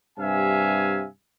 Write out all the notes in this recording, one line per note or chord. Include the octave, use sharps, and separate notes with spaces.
G2 C3 E5 F5 G#5